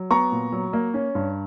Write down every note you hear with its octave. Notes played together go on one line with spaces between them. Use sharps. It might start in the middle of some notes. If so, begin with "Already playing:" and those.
Already playing: F#3
B3 A#5 C#6
A#2
F#3
A#3
C#4
G2